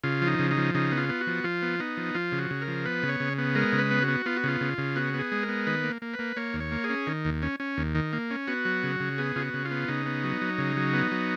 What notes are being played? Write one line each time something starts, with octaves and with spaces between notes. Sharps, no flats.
C#3 F4
F3
D#4
C#3
D#4
F3
C#3 D#4
B3
F4
B3
F#4
F3
F3 F4
B3
B3 D#4
F3
F3 F4
C#3
F#4
C#3
A#4
F3
B3 B4
C#3
C#5
C#3
B3
G#3 A#4
C#3
B4
B3
F#4
B3
B3 F4
F#4
C#3 F4
C#3
C#3
B3 F#4
B3
G#4
G#3
A#4
B3
D#3 B4
A#3
A#3
B4
A#3
A#3 C#5
D#2
C#5
A#3
G#4
C#4
D#3
D#2
C#4
C#4
D#2
D#3
A#3
C#4
B3 F#4
F#3
C#3
C#3
B3 G#4
C#3 F4
F#4
C#3
F4
B3
C#3 D#4
B3
F#3
F#3
C#3
F#3
B3
F#3